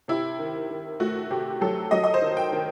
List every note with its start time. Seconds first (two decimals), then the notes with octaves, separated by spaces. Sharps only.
0.08 C3 E4
0.39 D#3
0.70 D#3
1.00 A3 F#4
1.30 C3 G4
1.61 F#3 A4
1.91 F#3 D#5
2.04 D#5
2.14 C5
2.22 D#3
2.37 G5
2.52 D#3